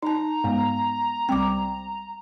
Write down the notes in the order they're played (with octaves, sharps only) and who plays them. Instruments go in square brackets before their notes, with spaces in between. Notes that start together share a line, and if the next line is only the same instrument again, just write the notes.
[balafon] D#4 A5 [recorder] A#5
[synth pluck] G#2 [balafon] G#3 B3
[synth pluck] C2 G3 C4 [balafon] G5 D6